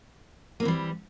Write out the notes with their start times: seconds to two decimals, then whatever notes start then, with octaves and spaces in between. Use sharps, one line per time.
0.60 A#3
0.63 C4
0.65 E3
0.68 G3